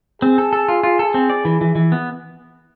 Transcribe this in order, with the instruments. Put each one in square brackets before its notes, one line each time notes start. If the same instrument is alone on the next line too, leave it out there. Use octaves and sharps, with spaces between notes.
[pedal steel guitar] C4 [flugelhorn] G#4
[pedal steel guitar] A4
A4
F4
F4
A4
C4
D5
E3
E3
E3
B3